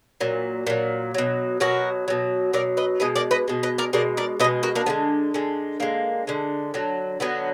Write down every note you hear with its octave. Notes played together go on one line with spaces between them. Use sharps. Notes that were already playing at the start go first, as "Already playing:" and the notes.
A#2 F#3
A#2 F#3
B2 F#3
B2 F#3 F#4 A#4
B2 F#3
B2 F#3 A#4 D5
B4 D#5
B2 G#3 B4 D#5
A#4 D5
B4 D#5
B2 G#3
B4 D#5
A#4 D5
B2 G#3 A#4 D5
A#4 D5
B2 G#3 B4 D#5
F#4 A#4
A#3 D4
D3 G#3 B3
D3 G#3
D3 G#3 A#3
D3 G#3
D3 F#3
D3 F#3 B3